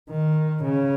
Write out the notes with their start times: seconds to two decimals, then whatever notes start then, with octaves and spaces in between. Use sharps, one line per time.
0.10 D#3
0.63 C#3